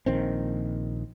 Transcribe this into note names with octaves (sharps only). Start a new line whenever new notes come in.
A#1 D#3 C4